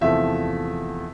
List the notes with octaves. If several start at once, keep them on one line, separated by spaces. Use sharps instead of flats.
E2 C3 F3 A3 E5